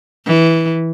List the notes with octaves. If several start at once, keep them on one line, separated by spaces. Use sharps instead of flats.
E3